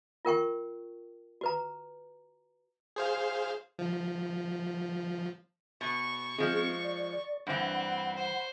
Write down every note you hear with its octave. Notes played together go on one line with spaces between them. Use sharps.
F4 A#4 G5 C#6
F#4 B4 A#5
G#4 C5 F5
F3
B2 C#6
F3 G#3 C4 G#4
D5
G2 E3 C4 F#5 B5
C5